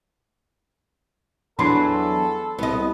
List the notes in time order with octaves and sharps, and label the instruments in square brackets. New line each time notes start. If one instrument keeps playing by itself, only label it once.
[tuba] E2 [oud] E3 F#3 D4 [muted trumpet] A4 [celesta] B5 C6 C7
[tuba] C2 [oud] B3 D#5